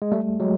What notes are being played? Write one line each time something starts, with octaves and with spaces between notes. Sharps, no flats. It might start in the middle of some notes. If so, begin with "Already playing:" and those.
G#3
G3 A3
F#3 G#3